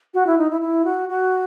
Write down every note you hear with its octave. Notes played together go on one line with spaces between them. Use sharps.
F#4
E4
D#4
E4
E4
F#4
F#4